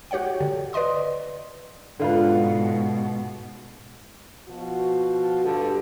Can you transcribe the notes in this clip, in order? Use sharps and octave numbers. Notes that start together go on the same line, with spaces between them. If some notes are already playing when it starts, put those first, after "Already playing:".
F#4 G4 C#5 F#5 G5
D3
B4 D5 D#5 C6 D#6
G#2 B2 D3 F4 B4
B2 F3 F#4
G2 D3 F4 G4 A4